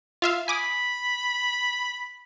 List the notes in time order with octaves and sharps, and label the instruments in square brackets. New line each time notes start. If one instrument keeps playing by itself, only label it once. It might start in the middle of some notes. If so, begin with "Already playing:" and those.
[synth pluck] F4 E5 F5
[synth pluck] G#5 D6 D#6 [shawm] B5